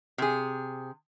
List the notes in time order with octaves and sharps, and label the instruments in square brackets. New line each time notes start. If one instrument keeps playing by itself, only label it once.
[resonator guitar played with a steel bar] C3 G#4